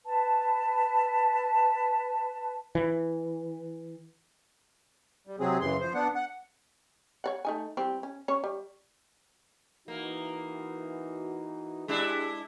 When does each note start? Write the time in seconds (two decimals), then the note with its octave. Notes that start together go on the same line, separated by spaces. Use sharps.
0.05 B4 A5
2.75 E3
5.27 G3
5.40 C3 F#3 G#3 C4 G#4
5.61 F#2 C#3 E3 C6
5.81 F3 C5
5.94 B3 D4 F#5
6.15 F#5
7.24 C#5 D5 F#5
7.45 A3 D#4 G#5
7.77 E3 G3 C4
8.03 C#4
8.28 C#4 C#5
8.44 G3
9.88 E3 A#3 D#4 F#4
11.88 G#3 D4 E4 G4 G#4